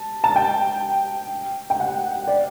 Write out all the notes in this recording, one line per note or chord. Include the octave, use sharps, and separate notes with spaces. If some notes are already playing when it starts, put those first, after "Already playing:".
Already playing: A5
A5
G5
G5
F#5
D5